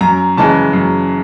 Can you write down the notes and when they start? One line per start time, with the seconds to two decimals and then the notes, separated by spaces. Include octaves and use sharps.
0.01 F#2 A#5
0.37 C#3 E3 G#3 A5
0.73 F#2